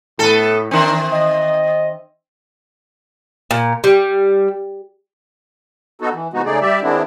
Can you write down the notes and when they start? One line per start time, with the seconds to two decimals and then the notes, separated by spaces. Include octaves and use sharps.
0.19 A2 B3 A4
0.71 D#3 C4 D4 D#4 A#4
1.12 D#5
3.51 A#2
3.84 G3
6.00 B3 D#4 F#4 A4
6.13 E3
6.33 C3 E3 G#3 B3 D#4 F#4
6.45 C#3 A3 D#4 G#4 D5
6.61 G3 G4 D5 E5
6.82 D#3 G#3 B3 C4 D4 E4